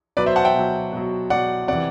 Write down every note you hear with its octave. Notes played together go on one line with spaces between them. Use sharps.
B2 F#3 B4 D5
C5 E5
F#5 A5
E5 G5
B2 F#3
B2 F#3
B2 F#3 D5 F#5
C3 E3 D5 F#5